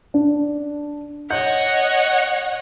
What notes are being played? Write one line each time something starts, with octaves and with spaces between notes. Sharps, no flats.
D4
C#5 D#5 F#5 G6